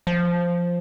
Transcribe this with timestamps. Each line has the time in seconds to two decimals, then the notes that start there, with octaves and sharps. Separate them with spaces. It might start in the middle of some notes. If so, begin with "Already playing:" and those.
0.07 F3